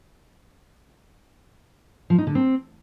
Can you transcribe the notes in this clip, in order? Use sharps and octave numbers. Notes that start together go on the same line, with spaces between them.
F3
D#4
D3
C4